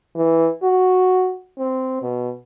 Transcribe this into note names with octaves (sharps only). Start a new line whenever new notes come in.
E3
F#4
C4
B2